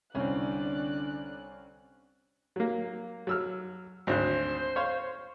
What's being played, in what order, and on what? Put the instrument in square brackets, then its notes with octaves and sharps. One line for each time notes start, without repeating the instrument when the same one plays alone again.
[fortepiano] C2 [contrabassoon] D3 [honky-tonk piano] C4 C#4 [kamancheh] D5 F#6
[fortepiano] F#3 A#3
F#3 E6 F6
[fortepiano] G#1 D2 F#6 [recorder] C5
[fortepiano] C#5 F5 C6